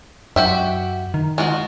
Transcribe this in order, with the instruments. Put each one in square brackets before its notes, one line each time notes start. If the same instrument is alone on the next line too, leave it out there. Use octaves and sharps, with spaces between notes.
[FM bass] F#2 [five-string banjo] F#4 G4 E5
[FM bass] D#3
[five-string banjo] G#3 F4 F#4